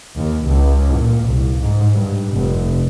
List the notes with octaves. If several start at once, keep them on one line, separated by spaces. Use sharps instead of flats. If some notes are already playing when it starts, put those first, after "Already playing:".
D#2
C#2
A#2
C2
G#2
G2
F1